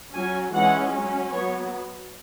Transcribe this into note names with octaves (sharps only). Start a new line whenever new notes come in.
F#3 C#4 G#5
E3 G#3 C#4 F#5
F#3 C#4
F#3 B3 C#5